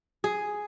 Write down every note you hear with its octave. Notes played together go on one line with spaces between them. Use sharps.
G#4